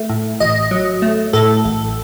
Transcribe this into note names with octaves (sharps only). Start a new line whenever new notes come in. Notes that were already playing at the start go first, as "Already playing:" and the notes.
Already playing: A3
A2
A1 D#5
F#3
A3
A2 A4
A1